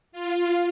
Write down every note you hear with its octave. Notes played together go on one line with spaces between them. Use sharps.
F4